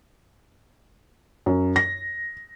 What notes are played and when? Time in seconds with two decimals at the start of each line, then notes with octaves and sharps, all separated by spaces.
1.46 F#2
1.76 A#6